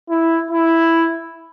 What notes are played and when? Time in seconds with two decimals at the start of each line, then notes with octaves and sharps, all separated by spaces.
0.10 E4
0.51 E4